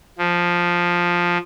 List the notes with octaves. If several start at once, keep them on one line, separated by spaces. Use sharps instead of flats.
F3